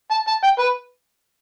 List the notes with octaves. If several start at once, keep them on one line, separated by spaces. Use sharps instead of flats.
A5
A5
G5
B4